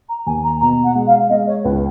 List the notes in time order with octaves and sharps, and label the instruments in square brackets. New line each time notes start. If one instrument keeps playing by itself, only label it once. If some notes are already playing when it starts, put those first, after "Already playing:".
[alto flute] A#5
[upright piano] D#2 [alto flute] G#5
[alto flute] A#5
[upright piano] B2 [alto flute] A#5
[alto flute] F#5
[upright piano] G#3
[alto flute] F5
[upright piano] G#3 [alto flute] D#5
[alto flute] C#5
[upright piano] C#2 [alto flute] B4